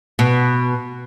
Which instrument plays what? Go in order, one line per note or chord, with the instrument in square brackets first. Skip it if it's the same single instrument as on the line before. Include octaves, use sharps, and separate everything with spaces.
[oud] B2